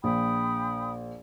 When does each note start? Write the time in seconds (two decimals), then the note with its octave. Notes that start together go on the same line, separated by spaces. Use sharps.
0.04 A#1 G5 B5 D#6